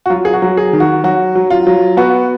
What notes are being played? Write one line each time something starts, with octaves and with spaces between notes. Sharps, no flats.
F#4
F#3 F4
G#4
F#4
F#3
G#4
D#3
F#4
F#3 F#4
F#3
F4
F#3
B3 F#4